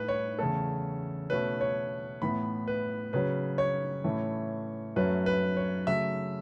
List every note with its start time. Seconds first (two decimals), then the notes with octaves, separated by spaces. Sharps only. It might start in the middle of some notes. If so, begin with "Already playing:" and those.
Already playing: A2 A3 B4
0.08 C#5
0.39 E2 C#3 A3 C#4 A4
1.30 B2 A3 C#4 B4
1.61 C#5
2.22 A2 E3 B3 B5
2.68 B4
3.13 C#3 F#3 C#4 B4
3.58 C#5
4.04 A2 E3 A3 C#4
4.96 F#2 F#3 A3 C#4 B4
5.26 B4
5.57 C#5
5.87 C#3 F#3 A3 C#4 E5